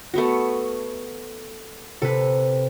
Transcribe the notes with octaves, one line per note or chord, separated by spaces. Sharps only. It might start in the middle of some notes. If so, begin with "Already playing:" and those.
A3 B3 F#4
C3 A4 B4